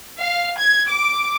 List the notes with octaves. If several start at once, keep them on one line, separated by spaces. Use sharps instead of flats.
F5
G#6
D6